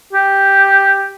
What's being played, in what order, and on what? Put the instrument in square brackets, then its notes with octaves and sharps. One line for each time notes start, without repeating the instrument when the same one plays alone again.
[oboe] G4